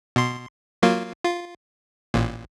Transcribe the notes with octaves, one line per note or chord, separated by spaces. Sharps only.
B2 C6
F#3 A#3 F4
F4
A1 A#2